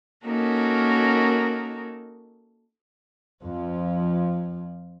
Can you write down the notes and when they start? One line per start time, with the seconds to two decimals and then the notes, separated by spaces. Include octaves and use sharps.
0.25 A#3 C#4 D#4 F#4 A4 A#4
3.43 F2 F3